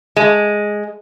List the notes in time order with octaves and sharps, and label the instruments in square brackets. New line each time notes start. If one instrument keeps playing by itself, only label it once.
[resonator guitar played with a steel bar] G#3